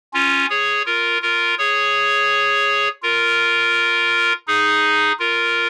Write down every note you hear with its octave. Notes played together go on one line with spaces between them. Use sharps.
C#4 F4
G#4 C#5
F4 A#4
F4 A#4
G#4 C#5
F4 A#4
D#4 G#4
F4 A#4